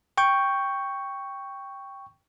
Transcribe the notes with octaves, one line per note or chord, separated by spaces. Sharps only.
G5 C#6 G6